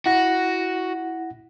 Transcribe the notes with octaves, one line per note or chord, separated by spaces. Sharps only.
E4 F#4 F#5 A#6